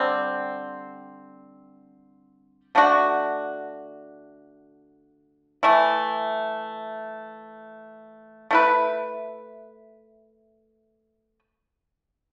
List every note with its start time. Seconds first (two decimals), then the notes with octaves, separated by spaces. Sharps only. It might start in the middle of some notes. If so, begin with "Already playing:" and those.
Already playing: D3 G3 C4
2.75 D3 A3 D4 F#4
5.63 E3 A3 E4
8.51 A3 E4 B4